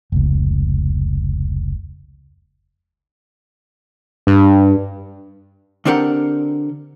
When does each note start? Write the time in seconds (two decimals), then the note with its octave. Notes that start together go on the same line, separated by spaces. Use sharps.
0.12 F1 C#2
4.27 G2
5.85 D3 C4 D4 G4 A#4 F#5